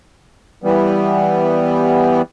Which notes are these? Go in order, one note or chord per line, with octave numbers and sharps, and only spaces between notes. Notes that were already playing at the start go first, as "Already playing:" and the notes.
E3 G3 B3